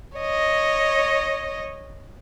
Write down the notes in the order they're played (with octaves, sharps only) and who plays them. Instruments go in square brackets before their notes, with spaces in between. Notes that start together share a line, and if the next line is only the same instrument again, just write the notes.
[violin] C#5 D#5